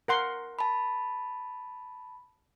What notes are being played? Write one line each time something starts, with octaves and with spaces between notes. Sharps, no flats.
A#4 F#5 C6
A5 B5